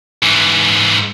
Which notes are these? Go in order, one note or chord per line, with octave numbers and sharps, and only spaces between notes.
G#2 E3